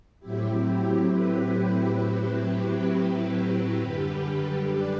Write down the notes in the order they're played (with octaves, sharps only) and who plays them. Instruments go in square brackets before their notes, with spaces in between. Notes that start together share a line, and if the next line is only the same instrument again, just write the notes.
[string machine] A2 F#3 C4 E4 G4
G4
G4 B4
F#2 D3 G3
B4 D5